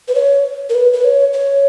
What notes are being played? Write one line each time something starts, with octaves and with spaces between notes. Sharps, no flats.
B4
C#5
A#4
B4
B4
C#5
C#5